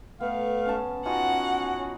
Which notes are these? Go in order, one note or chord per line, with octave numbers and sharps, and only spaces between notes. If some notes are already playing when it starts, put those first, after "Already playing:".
A3 B3 F5
C#4 A5
C#4 D#4 F4 F#4 F#5 A5